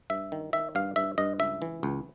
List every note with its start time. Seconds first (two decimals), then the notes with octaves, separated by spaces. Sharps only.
0.10 G2 E5
0.32 D#3
0.53 D#3 E5
0.75 G2 F5
0.96 G2 E5
1.18 G2 D#5
1.39 C#2 E5
1.62 E3
1.83 C#2